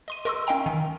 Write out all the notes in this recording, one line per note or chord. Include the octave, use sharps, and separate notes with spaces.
D#5 C6 D#7
A#4 D#5 C6 C#6 E6
C#4 D#5 F5 G5 A#5
D#3